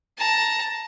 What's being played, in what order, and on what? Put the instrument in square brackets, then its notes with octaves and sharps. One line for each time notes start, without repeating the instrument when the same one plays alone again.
[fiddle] A5 A#5